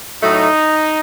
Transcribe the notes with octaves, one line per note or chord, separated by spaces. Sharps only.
A2 F#3 A3 D#4